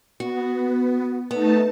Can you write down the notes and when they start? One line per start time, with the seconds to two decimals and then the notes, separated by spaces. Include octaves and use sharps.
0.20 B3 F#4
1.31 A3 B3 D#4 A5